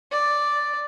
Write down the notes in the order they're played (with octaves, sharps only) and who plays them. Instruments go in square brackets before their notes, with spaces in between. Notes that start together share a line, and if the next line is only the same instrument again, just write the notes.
[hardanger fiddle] D5